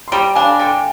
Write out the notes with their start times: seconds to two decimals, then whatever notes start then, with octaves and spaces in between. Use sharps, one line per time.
0.08 C6
0.12 G3 G5 A#5
0.35 D4 F5 G#5
0.59 D3 G5